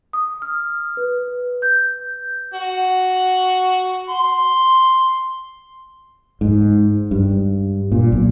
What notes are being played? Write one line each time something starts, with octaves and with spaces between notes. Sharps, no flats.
D#6
F6
B4
G6
F#4
C6
G#2
G2
A#2
B1